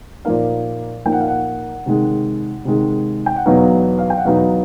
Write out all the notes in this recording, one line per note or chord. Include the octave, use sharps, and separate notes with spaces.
A#2 F3 A#3 D#4 F5
A#2 F3 A#3 D#4 G5
F#5
F5
F#5
C3 D#3 G#3
C3 D#3 G#3
G5
F#5
E2 B2 F#3 B3 D#4 F5
F5
G5
F#5
E2 B2 F#3 B3 D#4 F5